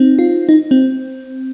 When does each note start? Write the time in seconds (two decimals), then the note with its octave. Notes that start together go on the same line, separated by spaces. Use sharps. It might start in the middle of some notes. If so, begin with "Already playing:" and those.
Already playing: C4 D#4
0.19 F4
0.49 D#4
0.71 C4